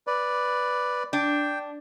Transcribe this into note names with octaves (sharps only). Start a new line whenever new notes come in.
B4 D5
D4 G5